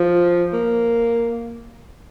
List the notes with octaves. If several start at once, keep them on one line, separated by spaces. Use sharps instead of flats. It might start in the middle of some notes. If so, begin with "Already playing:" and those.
Already playing: F3
A#3